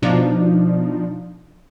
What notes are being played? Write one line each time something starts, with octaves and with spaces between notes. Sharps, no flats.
B2 F3 D4 D#4